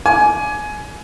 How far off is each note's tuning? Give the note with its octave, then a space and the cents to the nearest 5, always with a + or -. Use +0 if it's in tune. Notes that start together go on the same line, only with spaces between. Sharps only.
G#5 +20 D6 +0